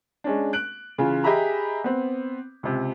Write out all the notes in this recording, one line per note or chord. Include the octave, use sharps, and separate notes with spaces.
G#3 C#4 D4
F#6 D7 F#7
C#3 E3 F4
G4 G#4 D#5 E5 A#5 B5
B3 C4
C#2 C3